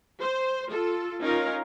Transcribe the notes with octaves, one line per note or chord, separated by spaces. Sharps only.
C5
F4 A4
C#4 D#4 F4 A#4 F5